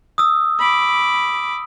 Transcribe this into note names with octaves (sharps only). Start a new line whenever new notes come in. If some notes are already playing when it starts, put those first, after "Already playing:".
D#6 E6
B5 D6